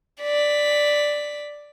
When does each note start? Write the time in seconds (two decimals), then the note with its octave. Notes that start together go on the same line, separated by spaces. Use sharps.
0.21 D5 B6